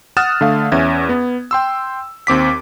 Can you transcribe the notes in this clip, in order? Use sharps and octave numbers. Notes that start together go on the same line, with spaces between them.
F#5 D#6 F6 F#6 A6 E7
D3 A3 F5
E2 C#4 E5 G#6
B3
G5 C6 E6
D#2 C4 D6 B6